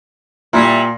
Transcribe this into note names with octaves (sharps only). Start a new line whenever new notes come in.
A#2 G3 E4